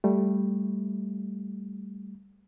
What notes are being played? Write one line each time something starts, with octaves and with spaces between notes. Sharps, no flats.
G3 A3